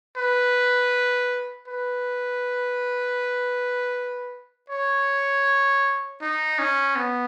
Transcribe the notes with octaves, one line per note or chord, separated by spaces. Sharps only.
B4
B4
C#5
D#4
C#4
B3